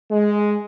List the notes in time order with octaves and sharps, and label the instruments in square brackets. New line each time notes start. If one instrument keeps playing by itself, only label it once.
[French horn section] G#3